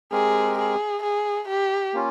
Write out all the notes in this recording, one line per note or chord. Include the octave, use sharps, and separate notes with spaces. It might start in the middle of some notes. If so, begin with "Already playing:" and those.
G#3 C4 G4 G#4 A#4
G#4
G#4
G4
A#3 C#4 F4